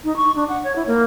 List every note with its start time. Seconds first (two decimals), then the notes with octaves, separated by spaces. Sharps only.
0.04 D#4
0.17 C#6
0.36 D4
0.49 F#5
0.64 C#5
0.76 E4
0.87 A#3